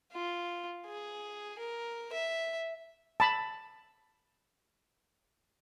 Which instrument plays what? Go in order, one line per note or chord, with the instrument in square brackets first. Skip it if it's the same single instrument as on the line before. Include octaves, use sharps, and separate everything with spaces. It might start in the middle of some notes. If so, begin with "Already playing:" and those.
[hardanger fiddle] F4
G#4
A#4
E5
[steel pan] A5 B5